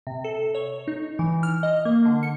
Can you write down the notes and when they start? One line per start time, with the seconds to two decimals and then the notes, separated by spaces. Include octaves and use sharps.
0.07 C3
0.24 A4
0.55 C#5
0.88 D#4
1.19 E3
1.43 F6
1.63 D#5
1.85 A#3
2.05 D3
2.23 C#7